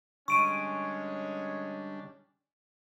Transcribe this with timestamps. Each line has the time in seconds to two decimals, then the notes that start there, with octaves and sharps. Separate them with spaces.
0.28 D3 G3 G#3 C#4 D4 C#6 D7 D#7